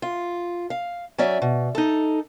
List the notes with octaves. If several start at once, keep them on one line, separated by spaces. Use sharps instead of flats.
F4
F5
F#3 C#4 D5 E5
B2
D#4 A4